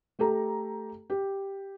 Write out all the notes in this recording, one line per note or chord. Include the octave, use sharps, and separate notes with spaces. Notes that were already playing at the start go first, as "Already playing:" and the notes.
A3 G4 A4 A#5
G4